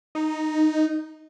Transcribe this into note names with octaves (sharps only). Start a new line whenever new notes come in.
D#4